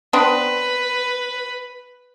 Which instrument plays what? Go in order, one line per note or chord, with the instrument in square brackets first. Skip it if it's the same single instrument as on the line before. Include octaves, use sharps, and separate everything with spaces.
[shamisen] B3 C4 D4 [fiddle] B4